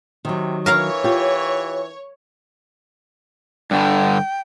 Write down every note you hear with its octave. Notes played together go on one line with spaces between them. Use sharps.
C3 D#3 F#3
E3 A#4 C#5 F5 A#5
F4 G4
G2 D3 G5